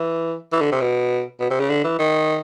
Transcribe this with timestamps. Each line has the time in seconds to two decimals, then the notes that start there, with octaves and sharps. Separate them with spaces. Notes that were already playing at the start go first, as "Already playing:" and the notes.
Already playing: E3
0.52 E3
0.61 D3
0.72 C3
0.81 B2
1.40 B2
1.51 C3
1.60 C#3
1.70 D3
1.84 E3
1.99 D#3